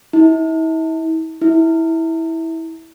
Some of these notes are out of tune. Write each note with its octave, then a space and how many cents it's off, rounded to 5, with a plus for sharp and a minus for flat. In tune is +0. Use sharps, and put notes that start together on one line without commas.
E4 -40
E4 -15